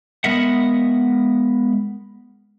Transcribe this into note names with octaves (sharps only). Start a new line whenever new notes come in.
G#3 B3 A#4 D#5 E5 F#5